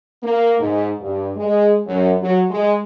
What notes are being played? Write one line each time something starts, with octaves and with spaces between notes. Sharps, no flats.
A#3
G#2
G2
G#3
F#2
F#3
G#3